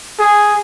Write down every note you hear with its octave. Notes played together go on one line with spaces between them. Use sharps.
G#4